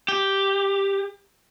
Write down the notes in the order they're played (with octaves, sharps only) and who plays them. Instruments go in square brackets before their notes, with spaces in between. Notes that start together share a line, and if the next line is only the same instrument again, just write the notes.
[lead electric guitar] G4